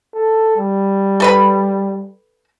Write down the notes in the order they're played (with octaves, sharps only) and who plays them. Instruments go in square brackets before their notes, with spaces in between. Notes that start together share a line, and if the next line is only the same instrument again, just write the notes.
[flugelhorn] A4
G3
[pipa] A4 B4 B5